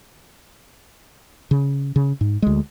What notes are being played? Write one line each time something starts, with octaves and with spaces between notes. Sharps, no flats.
C#3
C#3
G#2
D2 G#3